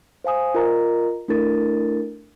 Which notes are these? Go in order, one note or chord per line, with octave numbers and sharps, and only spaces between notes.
C5 F5 G#5 D#6
F4 A#4 D#5 A#5
A3 D4 E4 A4 A#4 A6